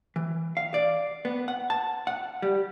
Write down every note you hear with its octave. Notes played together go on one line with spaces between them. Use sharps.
E3
F5
D5
B3
F#5
A5
F#5
G3